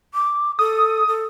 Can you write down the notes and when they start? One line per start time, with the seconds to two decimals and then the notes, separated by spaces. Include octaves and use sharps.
0.14 D6
0.59 A4 D#6
1.08 A4